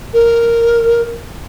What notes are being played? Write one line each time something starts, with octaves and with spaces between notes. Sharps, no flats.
A#4